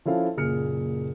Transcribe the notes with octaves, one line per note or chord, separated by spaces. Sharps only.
F3 C#4 E4 A4 F5
F#1 A#2 G#4 F6 C#7